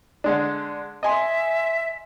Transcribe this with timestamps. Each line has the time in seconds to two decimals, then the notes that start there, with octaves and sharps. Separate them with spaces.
0.24 D3 G#3 D4
1.03 D#5 E5 G#5 C6